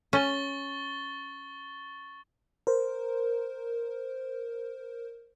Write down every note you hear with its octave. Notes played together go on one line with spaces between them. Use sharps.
C#4 C#6 A6 G7
A#4 C5